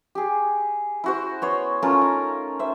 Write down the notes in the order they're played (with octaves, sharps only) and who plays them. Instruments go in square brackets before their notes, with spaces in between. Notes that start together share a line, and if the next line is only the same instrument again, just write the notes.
[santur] G4 G#4
E4 F#4 C5
B3 C#5 C6
A3 C#4 F4 A#4
D#4
C5 E5